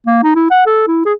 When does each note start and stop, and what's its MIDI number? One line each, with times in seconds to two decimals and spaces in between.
0.07 0.18 58
0.23 0.32 63
0.35 0.47 64
0.50 0.64 78
0.66 0.85 69
0.87 1.05 64
1.05 1.13 68